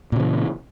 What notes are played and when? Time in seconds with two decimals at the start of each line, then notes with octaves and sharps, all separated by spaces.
0.12 A#2
0.16 C#3
0.20 E3